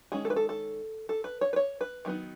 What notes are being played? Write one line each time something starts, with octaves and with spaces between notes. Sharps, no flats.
D#3 G#3 C#4 G#4
A4
B4
A4
A4
A4
B4
C#5
B4
C#5
B4
D#3 F#3 B3 D#4